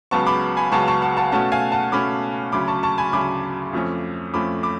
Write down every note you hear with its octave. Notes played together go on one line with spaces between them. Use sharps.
C#2 C#3 F#3 B3 A5 C#6
B5 D6
G#5 B5
C#2 C#3 F#3 B3 A5 C#6
A5 C#6
F#5 A5
F#5 A5
B2 A3 C#4 F#5 A5
F5 G#5
F#5 A5
B2 A3 C#4 B5 D6
D2 C#3 F#3 C#4 B5 D6
A5 C#6
A5 C#6
G#5 B5
D2 C#3 F#3 C#4 B5 D6
F2 F3 A3 C#4
F2 F3 A3 C#4 B5 D6
B5 D6